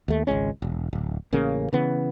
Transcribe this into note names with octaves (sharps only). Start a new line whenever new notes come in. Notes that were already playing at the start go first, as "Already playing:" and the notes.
D#2 A3
G#1 C#2 G#3 C#4
E1
D1
A1 C#3 A#3
C#3 E3 B3